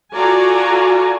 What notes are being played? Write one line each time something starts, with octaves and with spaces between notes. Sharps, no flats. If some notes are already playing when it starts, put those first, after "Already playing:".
F4 F#4 A4 D5 G#5 A#5